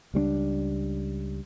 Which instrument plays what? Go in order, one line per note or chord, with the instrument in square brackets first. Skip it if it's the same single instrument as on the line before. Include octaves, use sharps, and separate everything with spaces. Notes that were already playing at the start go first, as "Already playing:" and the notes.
[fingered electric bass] C#2 G3 C4 D4